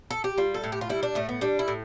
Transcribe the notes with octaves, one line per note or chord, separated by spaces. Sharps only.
A4
G4
G3 F4
A4
A2
G4
F4
G3 E4
D4
A2 A3
B3
G3 D4
E4
A2